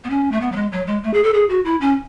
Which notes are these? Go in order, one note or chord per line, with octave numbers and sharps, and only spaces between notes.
B3
C#4
A3
B3
F#3
G#3
F#3
G#3
A3
G#4
A4
G#4
F#4
E4
C#4